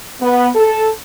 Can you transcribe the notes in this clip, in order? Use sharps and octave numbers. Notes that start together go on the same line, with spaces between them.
B3
A4